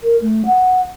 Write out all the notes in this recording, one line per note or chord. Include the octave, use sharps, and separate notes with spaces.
A#4
A3
F#5